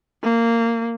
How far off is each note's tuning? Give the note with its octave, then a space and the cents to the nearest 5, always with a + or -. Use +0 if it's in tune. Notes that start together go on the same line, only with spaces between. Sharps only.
A#3 -15